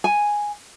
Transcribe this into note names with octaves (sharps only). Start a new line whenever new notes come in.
G#5